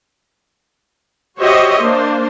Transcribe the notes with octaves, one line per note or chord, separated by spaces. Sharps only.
F#4 G4 C5 C#5 D#5 E5
A#3 D4 C5